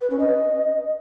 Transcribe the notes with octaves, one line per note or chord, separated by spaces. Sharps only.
B4
C#4
D#5